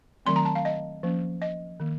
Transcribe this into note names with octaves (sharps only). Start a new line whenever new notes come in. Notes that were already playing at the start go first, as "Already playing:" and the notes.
D#3 F#3 A3 C4 C6
A#5
A5
F5
D#5
F3 A#3 C#4
D#5
D#3 A#3